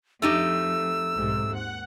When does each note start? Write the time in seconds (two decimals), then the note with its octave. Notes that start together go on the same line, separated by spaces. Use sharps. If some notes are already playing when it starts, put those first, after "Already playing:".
0.22 F2 A3 D#4 G4 E6
1.17 B1 G#2 C3
1.50 D#2 F#5